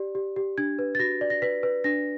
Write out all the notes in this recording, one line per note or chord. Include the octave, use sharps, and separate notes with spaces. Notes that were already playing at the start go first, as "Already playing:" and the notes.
Already playing: G4 D5
G4
G4
D4 G#6
B4
A6
F#4 A#6
D5
A#6
B4 B6
B4
D4 A#6